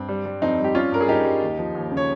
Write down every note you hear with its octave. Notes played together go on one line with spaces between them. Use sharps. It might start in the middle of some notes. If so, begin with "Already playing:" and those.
Already playing: G2 C4
G3
G3
F2 C4 D#4
G3
G4
G3 C#4 F4
G2 A#4
G#4
G2 D#4 G4
G3
D#2
F3
D#2
C#3
C#5